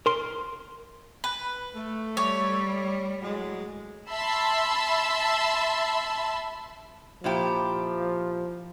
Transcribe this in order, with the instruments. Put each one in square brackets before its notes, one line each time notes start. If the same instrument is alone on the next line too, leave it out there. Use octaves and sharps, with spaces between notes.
[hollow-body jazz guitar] A#4 C6
[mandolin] B4
[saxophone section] A3
[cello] G3 [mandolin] C#5
[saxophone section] A2 F#3 G#3
[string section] E5 A5 B5 C6 E6
[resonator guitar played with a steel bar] A#2 E4 G4 [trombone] F3